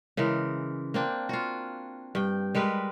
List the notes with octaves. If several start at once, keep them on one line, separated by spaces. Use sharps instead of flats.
C#3 E3 G#3 A#4
A#3 C4 D4
F4 F#4
G2 G5
G3 G#3 A#4 B4